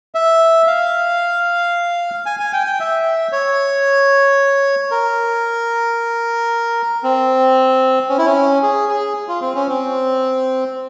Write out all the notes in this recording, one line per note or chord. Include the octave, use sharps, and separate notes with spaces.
E5
F5
G#5
G#5
G5
G5
E5
C#5
A#4
C4
C#4
E4
C#4
G#4
G#4
F4
C4
C#4
C4